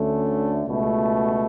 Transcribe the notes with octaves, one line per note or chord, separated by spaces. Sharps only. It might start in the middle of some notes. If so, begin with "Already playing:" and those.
Already playing: D2 D3 A3 C#4
C#2 B2 A3